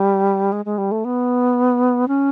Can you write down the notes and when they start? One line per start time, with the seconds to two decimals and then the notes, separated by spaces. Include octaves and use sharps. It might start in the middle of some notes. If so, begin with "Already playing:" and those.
Already playing: G3
0.52 G#3
0.65 G#3
0.78 G3
0.92 A3
1.05 B3
2.08 C#4